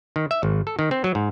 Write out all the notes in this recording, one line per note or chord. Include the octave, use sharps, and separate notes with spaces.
D#3
E5
G#1
A4
D#3
C4
F#3
G#2